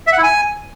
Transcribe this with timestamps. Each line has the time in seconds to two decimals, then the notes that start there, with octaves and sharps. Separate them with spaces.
0.07 E5
0.13 F#5
0.18 E4
0.23 G#5